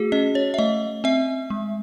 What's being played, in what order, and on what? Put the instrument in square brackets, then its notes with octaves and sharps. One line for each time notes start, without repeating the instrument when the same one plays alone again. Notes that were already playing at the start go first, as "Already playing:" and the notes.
Already playing: [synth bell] A3 F#4 G#4
C#4 D#5
C#5
E5
A3 D#5
C4 E5
G#3